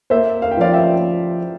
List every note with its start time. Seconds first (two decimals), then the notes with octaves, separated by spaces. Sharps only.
0.10 A#3 C5 E5
0.42 F5
0.51 G5
0.57 F3 D5 F5
0.73 E5 G5